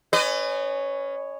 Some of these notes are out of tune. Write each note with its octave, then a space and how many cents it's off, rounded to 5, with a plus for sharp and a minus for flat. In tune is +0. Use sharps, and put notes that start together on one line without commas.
C#4 +0 B4 +30 D#5 -35